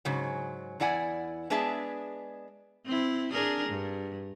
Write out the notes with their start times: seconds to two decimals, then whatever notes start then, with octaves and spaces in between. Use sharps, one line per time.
0.05 G#2 C#3 F#3
0.80 E2 E4 D5 F#5 G#5
1.50 G#3 B3 D4 G#4 E5 A5
2.86 C4 E4
3.31 D4 G#4 A#4
3.69 G2